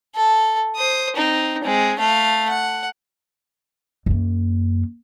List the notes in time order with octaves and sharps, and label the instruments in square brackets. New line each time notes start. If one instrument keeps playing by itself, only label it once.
[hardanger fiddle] A4
C5 D#6
C4 D#4
G#3 C4
A3 F5
F#5
[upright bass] F#2 A#3